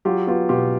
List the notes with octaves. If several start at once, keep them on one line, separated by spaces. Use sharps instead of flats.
F#3 F4 G4
B3 F4 G4
B2 F4 G4